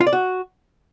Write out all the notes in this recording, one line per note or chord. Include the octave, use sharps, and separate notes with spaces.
F4
D5
F#4